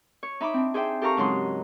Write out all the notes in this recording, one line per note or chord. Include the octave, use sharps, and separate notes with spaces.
C#5
D#4 E5 B5 D6
C4 D4
G#4 C5 D5 E5 G5
G4 A4 A#4 F5 A#5 C#6
G#2 C#3 F#3 C6 D#6